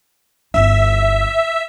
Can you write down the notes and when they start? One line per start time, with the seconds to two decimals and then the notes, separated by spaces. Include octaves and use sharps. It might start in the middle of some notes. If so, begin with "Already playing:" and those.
0.54 G1 E4 E5